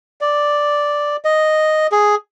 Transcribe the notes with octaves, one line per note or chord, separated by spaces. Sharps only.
D5
D#5
G#4